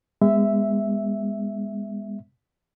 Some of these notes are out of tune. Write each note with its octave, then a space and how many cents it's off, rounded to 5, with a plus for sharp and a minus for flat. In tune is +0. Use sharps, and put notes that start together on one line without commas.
G#3 -30 B3 -5 E5 +0